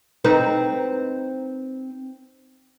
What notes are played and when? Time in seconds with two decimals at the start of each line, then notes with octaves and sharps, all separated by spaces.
0.25 C4 D#4 B4